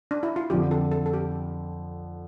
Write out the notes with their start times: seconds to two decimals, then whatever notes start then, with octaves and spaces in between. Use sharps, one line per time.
0.11 D4
0.23 E4
0.36 F4
0.50 F2 D3 F3 G4
0.71 A4
0.92 A4
1.06 A4
1.13 G4